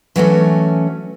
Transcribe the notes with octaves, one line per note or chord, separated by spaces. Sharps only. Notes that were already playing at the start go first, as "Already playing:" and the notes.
E3 F#3 A3 C#4